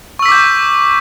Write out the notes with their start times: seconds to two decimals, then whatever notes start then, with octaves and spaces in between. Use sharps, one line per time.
0.19 C#6
0.22 E6
0.26 B6
0.29 D6
0.32 G6